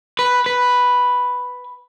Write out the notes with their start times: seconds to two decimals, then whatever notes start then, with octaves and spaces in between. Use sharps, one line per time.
0.19 B4
0.46 B4